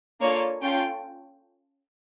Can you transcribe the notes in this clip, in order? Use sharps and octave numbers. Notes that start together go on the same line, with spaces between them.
A#3 D4 F4 A4 C#5
C#4 F4 A4 G5